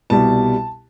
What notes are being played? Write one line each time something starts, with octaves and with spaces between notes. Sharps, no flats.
C2 B2 G3 A5